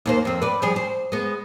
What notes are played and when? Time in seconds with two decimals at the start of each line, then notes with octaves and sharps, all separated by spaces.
0.06 D#2 A#3 C5
0.25 F2 C4
0.42 B4 D5
0.62 F3 G3 G#4
0.76 C5
1.12 G#3 B3